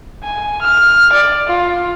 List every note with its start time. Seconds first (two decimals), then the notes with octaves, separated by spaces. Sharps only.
0.23 G#5
0.61 F6
1.12 D5
1.47 F4